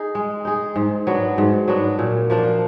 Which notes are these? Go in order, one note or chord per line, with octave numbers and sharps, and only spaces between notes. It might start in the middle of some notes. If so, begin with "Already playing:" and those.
Already playing: D#4 G#4
G#3
D#4 G#4
G#2
F#3 B3 D4
G#2
F#3 B3 D4
A#2
F3 A#3 D4